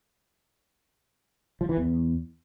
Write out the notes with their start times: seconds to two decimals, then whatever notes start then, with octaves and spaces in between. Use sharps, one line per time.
1.61 F3
1.69 E3
1.77 E2